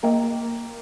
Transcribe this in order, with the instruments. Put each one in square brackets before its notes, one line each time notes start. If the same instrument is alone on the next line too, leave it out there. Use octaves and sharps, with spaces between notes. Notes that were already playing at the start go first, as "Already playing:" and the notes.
[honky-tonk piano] A#3 [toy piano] A#4 D#5 G5 A#5